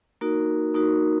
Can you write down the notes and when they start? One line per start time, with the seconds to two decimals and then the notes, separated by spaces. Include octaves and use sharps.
0.21 A#3 D#4 F#4 A#4
0.74 A#3 D#4 F#4 A#4